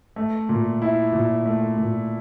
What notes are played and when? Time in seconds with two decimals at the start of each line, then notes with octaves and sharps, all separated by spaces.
0.16 A3
0.49 A#2
0.82 E4
1.13 A#2
1.46 A3
1.78 A#2